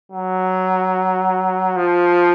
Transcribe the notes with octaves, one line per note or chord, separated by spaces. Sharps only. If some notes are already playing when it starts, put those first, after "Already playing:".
F#3
F3